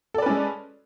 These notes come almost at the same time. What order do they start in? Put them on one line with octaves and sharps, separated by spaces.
A4 D5 B4 C#4 G#3